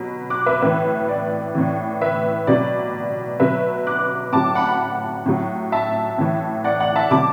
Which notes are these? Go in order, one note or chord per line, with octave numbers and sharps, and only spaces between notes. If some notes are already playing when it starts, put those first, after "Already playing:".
Already playing: B2 F#3
D6 F#6
B4 E5
A2 E3 B4 E5
D5
A2 E3
B4 E5
B2 F#3 D5
B2 F#3 B4 E5
D6 F#6
A2 F#3 A5 D6
F#5 B5
A2 F#3
E5 A5
A2 E3
D5 F#5
D5 F#5
E5 A5
B2 F#3 A5 D6